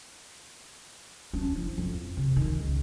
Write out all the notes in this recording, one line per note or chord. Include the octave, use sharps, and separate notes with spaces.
C#4 D4
F3 E4
F2
C3
D#3
C#2